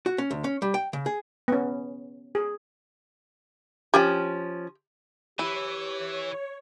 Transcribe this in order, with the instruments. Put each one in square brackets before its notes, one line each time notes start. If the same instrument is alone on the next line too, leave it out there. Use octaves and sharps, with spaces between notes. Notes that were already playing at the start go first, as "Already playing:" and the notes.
[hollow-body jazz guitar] F#4
C#4
D2
C#4
G3
G5
C#3
G#4
[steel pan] B3 C#4
G#4
[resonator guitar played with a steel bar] F3 C#4 [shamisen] G4 G5
[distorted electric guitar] E3 [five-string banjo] E4 [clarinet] G4 [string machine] C#5